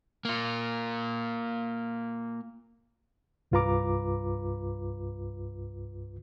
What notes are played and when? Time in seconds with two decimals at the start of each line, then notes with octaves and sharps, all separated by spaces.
0.25 A#3 F4
3.52 C2 G2 F4 B4 A#5 D6